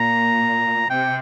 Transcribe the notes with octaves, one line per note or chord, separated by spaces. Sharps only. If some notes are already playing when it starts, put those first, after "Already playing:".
Already playing: A#2 A#5
C3 G5